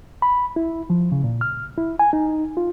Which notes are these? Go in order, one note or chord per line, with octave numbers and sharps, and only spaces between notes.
B5
E4
F3
C#3
A#2
F6
E4
G#5
D#4
F4